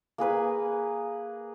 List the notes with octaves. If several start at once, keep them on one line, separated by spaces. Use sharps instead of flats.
A#3 G#4 B4 G#5